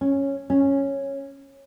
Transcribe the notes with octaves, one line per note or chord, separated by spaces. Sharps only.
C#4
C#4